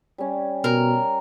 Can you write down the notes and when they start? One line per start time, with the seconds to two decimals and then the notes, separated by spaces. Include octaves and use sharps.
0.18 G3 C#4
0.64 B2 A#4